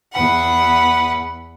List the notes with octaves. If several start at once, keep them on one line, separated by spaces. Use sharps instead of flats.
E2 B4 F#5